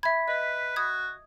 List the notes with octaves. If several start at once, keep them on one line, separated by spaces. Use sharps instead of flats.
E5 B5 G#6 B6
B4 D#5
F#4 D#6 G#6